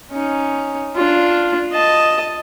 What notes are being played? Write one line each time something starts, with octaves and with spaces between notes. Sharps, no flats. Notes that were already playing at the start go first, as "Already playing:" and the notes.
C#4 D#4
D4 F4
D#5 A5